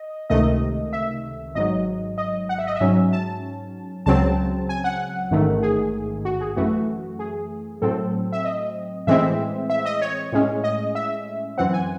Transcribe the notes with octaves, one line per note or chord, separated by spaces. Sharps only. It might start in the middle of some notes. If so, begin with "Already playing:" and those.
Already playing: D#5
C#2 C3 D#3 A3 D#5
E5
G#1 G#2 F#3 D#5
D#5
F#5
E5
D#5
E5
G#2 F#3 C#4
A5
C#2 C#3 F#3 C4 A5
G#5
F#5
A1 G#2 D#3 A3
G#4
F#4
G#4
F#2 E3 A3 F#4
G#4
A2 F#3 C4 A4
E5
D#5
A2 E3 G#3 C4 E5
E5
D#5
C#5
A2 G#3 C#4
D#5
E5
F#2 E3 C4 F#5
G#5